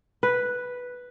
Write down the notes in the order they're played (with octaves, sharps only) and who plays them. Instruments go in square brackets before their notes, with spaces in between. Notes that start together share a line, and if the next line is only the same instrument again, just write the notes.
[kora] B4